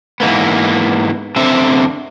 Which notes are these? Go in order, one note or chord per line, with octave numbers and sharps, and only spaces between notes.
G#2 E3 A#3 B3
F#2 D3 C4 E5